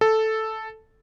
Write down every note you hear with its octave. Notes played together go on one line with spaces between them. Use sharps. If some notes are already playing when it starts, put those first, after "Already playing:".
A4